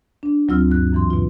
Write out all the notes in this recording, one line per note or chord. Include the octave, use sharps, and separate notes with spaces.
D4
D2 F#3 C4 F4 E6 F6
G2 F#6
F#2 E3 C6
B2 F4